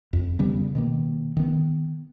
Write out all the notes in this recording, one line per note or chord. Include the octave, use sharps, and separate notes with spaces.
F2
C#3 G3 B3
B2 D#3 A#3
D#3 B3